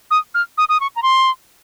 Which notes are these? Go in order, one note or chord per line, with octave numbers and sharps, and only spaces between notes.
D#6
F6
D#6
D#6
C#6
A#5
C6